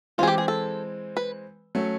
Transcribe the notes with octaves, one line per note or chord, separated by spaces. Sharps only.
E3 G#3 C4 F4 G#4
G4
G#4
A4
B4
F#3 A3 C#4